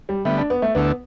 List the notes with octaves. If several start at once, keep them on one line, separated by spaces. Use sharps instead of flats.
G3
D3 G3 A3 B3
D4
B3
A3
D2 D3 A3 B3 E4